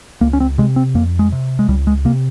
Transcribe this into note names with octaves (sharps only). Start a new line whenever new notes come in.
C#2 A#3
C#4
C4
C3 G#3
C4
F2 A#3
G#3
C3
G#3
C#2 G3
G#3
C3 A#3